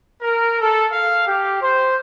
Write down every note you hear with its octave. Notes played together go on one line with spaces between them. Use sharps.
A#4
A4
F5
G4
C5